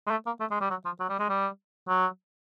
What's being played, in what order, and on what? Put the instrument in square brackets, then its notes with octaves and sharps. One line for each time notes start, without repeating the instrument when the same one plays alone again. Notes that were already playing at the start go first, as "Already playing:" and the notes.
[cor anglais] G#3
A3
A#3
A3
G#3
G3
F#3
F3
F#3
G3
G#3
G3
F#3